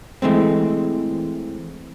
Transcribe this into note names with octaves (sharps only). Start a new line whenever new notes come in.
E3 G#3 A3 C4